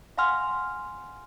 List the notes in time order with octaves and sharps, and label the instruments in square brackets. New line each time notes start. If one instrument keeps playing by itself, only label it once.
[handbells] F5 F#5 G#5 C6 F6